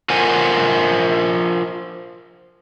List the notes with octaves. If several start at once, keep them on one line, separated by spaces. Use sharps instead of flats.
F4 A#4 C5 F#5 G#5